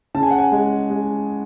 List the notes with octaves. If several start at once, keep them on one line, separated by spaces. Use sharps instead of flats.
C#3 A5
G#5
F#5
G#5
G#3
G#3